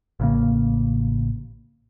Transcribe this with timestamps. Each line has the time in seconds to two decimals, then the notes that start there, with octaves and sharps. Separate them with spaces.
0.20 A1 C#3 A#3